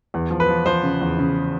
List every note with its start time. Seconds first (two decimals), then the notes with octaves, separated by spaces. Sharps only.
0.14 E2
0.31 F3
0.40 B4
0.49 F3
0.66 F3 C5
0.83 C#3
1.01 E2
1.19 C#3